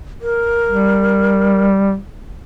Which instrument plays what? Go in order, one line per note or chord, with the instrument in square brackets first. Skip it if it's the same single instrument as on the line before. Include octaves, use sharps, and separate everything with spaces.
[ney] A#4
[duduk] G3